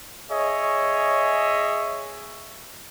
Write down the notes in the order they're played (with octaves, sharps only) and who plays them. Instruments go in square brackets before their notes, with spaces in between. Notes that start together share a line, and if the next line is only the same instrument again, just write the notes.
[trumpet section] G#4 C#5 D#5 E5